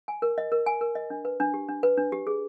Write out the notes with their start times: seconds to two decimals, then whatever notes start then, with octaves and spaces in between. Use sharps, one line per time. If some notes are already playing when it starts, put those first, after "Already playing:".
0.08 G#5
0.22 A#4
0.38 D#5
0.52 A#4
0.66 G#5
0.81 A#4
0.95 D#5
1.10 D4
1.25 B4
1.40 D4
1.54 G4
1.69 D4
1.83 B4
1.97 D4
2.12 G4
2.27 G#4